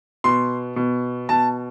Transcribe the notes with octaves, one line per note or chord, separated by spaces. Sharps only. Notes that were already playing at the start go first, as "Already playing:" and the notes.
B2 C6
B2
B2 A5